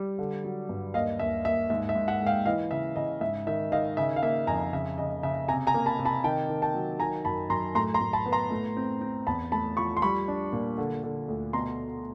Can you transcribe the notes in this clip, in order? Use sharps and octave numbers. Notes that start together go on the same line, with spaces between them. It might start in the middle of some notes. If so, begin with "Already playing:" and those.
Already playing: G3
D3
F#3
G2
D#2 D#5 F5
D#2 E5
D#2 E5
G#2 E5
E5
G#2
E5 F#5
G#3
F5 G5
E3 D#5 F5
C#3 E5
C#3 D#5
G#2 E5
D#3 E5
D#3 D#5 F5
C#3 E5
F5
A#3 E5
F2 G#5 A#5
C#3 E5
C#3 D#5
C#3 E5
C3 G#5 A#5
G#5 A#5
A#3
A5 B5
C3
A5 B5
D#3 G5 A5
D#3
G5 A5
F#3
D#3 G#5 A#5
F#2 A5 B5
F#2 A#5 C6
A2 A#5 C6
A#5 C6
A2
A5 B5
B3
A#5 C6
A2
C4
C4
E2 A5 B5
A3 A5 B5
F3 B5 C#6
C6
G3 B5 C#6
D4
A#2
D3
D3
D2
B2 A#5 C6